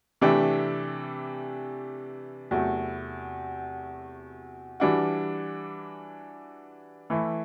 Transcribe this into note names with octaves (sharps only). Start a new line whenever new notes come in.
C3 E3 A3 D4 G4
E2 C3 F#3 A3
E3 G3 D4 F#4
E3 A3 E4